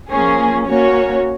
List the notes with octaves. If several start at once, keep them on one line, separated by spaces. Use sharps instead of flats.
F3 A#3 C#4 G#4
A#3 C#4 F#4 C#5